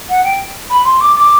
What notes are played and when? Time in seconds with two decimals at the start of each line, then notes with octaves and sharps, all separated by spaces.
0.09 F#5
0.24 G5
0.70 B5
0.84 C6
1.01 D6
1.16 D6